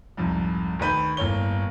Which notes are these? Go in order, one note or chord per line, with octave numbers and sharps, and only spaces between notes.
C2 F2 G#2
D2 D#3 B4 G6
G1 A2 A#3 C#5 G7